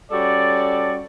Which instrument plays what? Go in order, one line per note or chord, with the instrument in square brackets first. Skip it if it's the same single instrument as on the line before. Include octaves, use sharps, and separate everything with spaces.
[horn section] G3 C#4 F#4 A4 D5